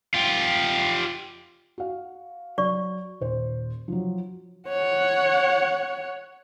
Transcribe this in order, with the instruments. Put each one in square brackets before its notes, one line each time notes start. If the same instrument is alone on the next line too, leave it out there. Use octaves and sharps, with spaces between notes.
[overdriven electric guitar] F4 G4
[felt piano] F#4 F5
[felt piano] F#3 [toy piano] D5 C#6
[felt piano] D#1 C5
F3 F#3
[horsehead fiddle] C#5 F#5